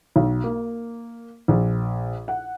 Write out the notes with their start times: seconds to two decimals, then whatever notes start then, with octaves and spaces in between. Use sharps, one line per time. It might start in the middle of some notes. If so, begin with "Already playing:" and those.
0.16 B1
0.44 A#3
1.48 A#1
2.28 F#5